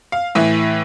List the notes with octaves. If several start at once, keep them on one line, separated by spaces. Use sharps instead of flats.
F5
A2 E3 E5